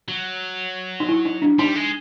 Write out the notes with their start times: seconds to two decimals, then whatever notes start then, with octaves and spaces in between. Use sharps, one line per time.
0.08 F#3
1.00 D#4
1.09 E4
1.25 D#4
1.42 D4
1.59 G3 D#4
1.75 G#3